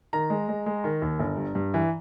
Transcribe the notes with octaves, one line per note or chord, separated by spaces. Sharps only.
D#3 A#5
G#3
G#3
G#3
D#3
D#2
G1
G2
G2
E3